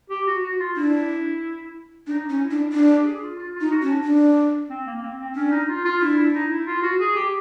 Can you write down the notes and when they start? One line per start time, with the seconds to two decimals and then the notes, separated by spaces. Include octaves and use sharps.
0.10 G4
0.27 F#4
0.43 F#4
0.60 F4
0.76 D4 E4
2.07 D4 D#4
2.30 C#4
2.40 E4
2.51 D4
2.73 D4
2.90 G4
3.06 G#4
3.22 F4
3.38 F4
3.55 F4
3.61 D#4
3.72 F#4
3.82 C#4
3.88 D4
4.04 D4
4.70 C4
4.86 A#3
5.02 C4
5.20 C4
5.36 C#4 D4
5.52 D#4
5.69 F4
5.85 F4
6.01 D4 E4
6.17 E4
6.34 D#4
6.50 E4
6.66 F4
6.83 F#4
7.00 G#4
7.16 G4